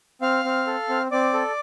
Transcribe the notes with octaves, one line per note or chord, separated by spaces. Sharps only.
C4 F5 F6
C4
A4
C4
C4 D5 D6
A4